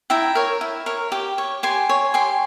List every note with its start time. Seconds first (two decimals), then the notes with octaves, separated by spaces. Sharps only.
0.10 E4 G5 A#5
0.35 A#4 C#5
0.61 E4
0.86 A#4 C#5
1.12 G4
1.38 C#5
1.63 G4 G#5 C6
1.89 C#5
2.14 G4 G#5 C6